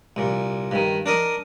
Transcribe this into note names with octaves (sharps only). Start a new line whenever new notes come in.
C2 A#2
G2 D#3
D4 A#4 D#5